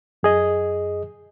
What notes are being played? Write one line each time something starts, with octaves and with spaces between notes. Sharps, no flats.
F#2 G#4 D#5